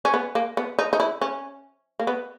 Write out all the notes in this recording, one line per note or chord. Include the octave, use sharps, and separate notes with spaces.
C#4
B3
A#3
B3
D#4
D#4
E4
C#4
A#3
B3